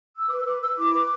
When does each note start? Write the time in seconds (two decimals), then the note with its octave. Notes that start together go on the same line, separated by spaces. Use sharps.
0.16 E6
0.28 B4 D6
0.40 E6
0.45 B4 D6
0.61 B4 E6
0.77 E4 D6
0.94 B4